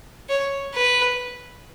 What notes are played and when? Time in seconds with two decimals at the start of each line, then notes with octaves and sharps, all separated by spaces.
0.29 C#5
0.74 B4